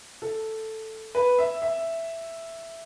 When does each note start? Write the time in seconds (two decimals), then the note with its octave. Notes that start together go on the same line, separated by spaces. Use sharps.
0.22 A4
1.15 B4
1.39 E5
1.62 E5